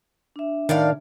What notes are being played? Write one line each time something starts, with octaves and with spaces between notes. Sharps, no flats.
D4 E5
A2 D#3 D5 F5